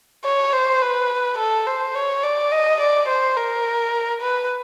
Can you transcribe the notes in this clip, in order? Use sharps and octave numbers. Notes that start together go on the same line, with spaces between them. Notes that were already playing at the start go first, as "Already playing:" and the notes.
C#5
C5
B4
A4
C5
C#5
D5
D#5
D5
C5
A#4
B4